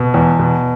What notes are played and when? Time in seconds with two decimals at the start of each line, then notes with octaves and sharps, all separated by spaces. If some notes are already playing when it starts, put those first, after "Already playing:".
Already playing: B2
0.14 E2
0.39 B2